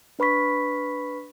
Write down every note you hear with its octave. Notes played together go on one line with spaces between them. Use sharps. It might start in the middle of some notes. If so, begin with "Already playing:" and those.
D4 B4 B5 C#6 B6